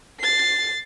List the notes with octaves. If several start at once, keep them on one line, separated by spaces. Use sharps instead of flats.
A6 C7